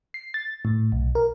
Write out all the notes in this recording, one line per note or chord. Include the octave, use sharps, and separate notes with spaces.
C7
A6
A2
B1
A#4